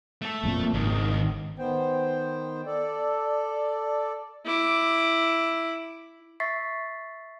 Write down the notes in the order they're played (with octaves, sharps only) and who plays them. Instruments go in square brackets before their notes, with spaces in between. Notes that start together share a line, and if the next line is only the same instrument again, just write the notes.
[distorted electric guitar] A3 A4
[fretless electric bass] E1 F2 A#2
[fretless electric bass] G#1 [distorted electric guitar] C#2 D#3
[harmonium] D#3 B3 C5 G5
A4 D5
[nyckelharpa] E4 D6
[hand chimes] E5 C#6 A6 B6 C7